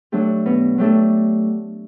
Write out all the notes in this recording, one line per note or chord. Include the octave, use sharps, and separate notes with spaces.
F#3 A3 D4 G4
B2
F#3 A3 D4 G4